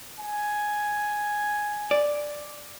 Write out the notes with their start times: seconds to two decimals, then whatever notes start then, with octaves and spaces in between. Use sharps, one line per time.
0.20 G#5
1.91 D5